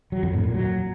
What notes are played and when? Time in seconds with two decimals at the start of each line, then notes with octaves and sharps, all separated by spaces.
0.12 F#3
0.23 F2
0.33 A2
0.44 A#2
0.54 F#3